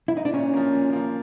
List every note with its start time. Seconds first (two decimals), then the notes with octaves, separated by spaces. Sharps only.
0.08 E4
0.17 D#4
0.25 D4
0.33 A#2 C#4
0.53 F3 A#3
0.73 A#2
0.93 F3 A#3